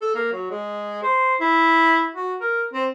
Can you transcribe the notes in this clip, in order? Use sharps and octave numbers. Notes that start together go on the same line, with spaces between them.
A4
A#3
F#3
G#3
C5
E4
F#4
A#4
C4